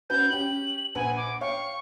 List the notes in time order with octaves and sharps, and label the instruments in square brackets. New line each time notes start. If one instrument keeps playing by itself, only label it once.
[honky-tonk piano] C#4 F#4 B4 [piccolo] G6
[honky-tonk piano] C#4 G4 [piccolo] F#7
[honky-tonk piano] A#1 B4 F#5 [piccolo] G#5
[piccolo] D6
[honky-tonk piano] C#5 F5 G5 [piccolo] C#6